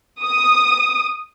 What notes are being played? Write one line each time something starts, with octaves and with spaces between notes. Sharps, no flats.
D#6